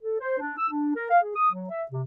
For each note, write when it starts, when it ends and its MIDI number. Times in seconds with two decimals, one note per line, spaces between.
0.02 0.18 69
0.19 0.37 72
0.39 0.54 62
0.58 0.68 88
0.70 0.92 62
0.96 1.10 70
1.10 1.19 77
1.22 1.35 68
1.35 1.49 87
1.52 1.66 54
1.70 1.83 76
1.92 2.01 48